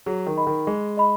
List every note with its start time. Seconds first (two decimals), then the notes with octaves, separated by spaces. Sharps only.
0.06 F#3 G#4
0.27 D#3
0.37 D#5 B5
0.47 D#3
0.67 G#3 G#4
0.97 D#5 B5